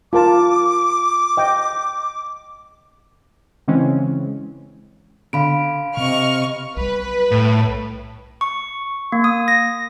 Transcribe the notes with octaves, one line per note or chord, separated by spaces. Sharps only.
F4 A#4 A5 D6
D#5 G5
C#3 E3 G#3 C4 C#4
D3 F5 B5 D7
C3 D#5 C#6 F6
B1 G3 B4
A2
C#6
A#3
D#6
A#6